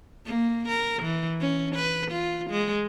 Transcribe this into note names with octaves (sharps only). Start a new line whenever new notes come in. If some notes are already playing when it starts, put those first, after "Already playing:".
A#3
A#4
E3
C#4
B4
F4
G#3